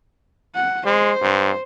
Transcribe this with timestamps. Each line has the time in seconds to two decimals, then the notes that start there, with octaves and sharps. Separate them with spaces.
0.55 F#5
0.86 G#3 C5
1.22 G2